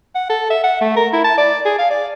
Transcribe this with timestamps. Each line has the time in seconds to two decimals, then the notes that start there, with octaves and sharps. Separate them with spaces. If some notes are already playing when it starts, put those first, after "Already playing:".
0.15 F#5
0.29 A4
0.50 E5
0.63 F#5
0.81 A3
0.96 A#4
1.13 E4
1.24 A5
1.37 D5
1.65 G#4
1.79 F5
1.90 D5